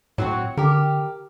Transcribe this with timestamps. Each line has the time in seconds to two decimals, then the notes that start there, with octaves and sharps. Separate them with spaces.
0.18 A2 F#3 C4 F#4
0.57 D3 G4 A#4